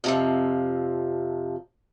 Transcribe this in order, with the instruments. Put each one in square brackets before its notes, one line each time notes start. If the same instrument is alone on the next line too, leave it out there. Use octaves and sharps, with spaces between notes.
[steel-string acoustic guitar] F2 C3 F3